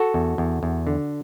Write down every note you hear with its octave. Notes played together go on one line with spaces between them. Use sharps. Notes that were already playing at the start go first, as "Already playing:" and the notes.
Already playing: F#4 A4
E2
E2
E2
D3